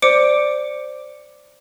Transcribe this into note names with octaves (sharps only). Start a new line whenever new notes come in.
C5 D5 D6 C#7 D7